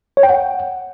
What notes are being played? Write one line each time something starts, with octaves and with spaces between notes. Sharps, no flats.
C#5
G5
F#5